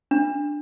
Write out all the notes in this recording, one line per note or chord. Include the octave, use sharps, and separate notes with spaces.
D4